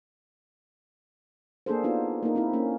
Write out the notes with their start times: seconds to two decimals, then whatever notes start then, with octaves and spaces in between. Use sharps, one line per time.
1.66 A#3 D4 G#4 A4 C5
1.84 B3 D4 D#4 F4 F#4
2.23 A#3 D#4
2.35 C4 D#4 E4
2.53 A#3 C#4